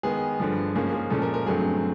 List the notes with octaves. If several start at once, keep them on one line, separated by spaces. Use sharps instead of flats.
D#3 G#3 B3 G#4
G2 D3 F3
G#2 F3 A#3 C#4 G#4
G#4
A#2 F3 G#3 C#4 A4
A#4
A#4
G2 D3 F#3 A3 C4 G#4